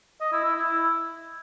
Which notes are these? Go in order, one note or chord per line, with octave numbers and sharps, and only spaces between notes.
D#5
E4
E4
E4